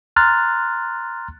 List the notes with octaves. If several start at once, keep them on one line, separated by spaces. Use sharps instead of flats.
A#5 C6 F6 F#6 A6